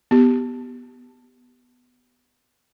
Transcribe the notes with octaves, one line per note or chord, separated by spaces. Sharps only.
B3 G4